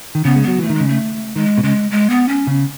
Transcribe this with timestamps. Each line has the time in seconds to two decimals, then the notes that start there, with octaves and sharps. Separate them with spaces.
0.15 D#3
0.25 C#3 B3
0.36 G#3
0.43 F#3 B3
0.59 E3 A3
0.70 D#3
0.75 G#3
0.80 C#3
0.88 A3
1.36 D#3 G#3
1.58 B2
1.63 C#3 G#3
1.91 G#3
2.10 B3
2.28 C#4
2.47 C#3